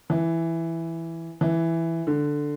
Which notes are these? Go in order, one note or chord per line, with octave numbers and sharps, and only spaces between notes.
E3
E3
D3